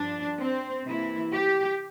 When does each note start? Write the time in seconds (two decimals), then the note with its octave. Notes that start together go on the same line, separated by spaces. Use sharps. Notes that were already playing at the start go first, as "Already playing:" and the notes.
Already playing: G2 F3 D4
0.39 C4
0.86 C3 E3 A#3 E4
1.33 G4